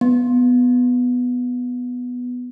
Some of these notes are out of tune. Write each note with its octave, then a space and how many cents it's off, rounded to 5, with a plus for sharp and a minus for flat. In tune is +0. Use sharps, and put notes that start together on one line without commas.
B3 +5